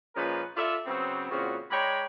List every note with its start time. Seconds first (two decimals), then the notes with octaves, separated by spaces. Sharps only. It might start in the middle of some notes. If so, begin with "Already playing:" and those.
0.15 A#2 F3 G#3 C#4 A#4 B4
0.56 F4 A4 D5 E5
0.86 C#3 F#3 B3 C4
1.30 A#2 C#3 E3 C4 F#4
1.71 G#3 C#5 D5 G5 A#5 B5